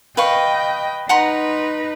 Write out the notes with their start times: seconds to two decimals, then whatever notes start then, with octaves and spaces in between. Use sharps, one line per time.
0.17 B4 D#5 F5 G5 C#6
1.09 D#4 B4 F#5 A#5 C6